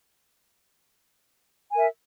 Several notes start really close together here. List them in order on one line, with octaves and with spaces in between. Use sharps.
G#5 A#4 E5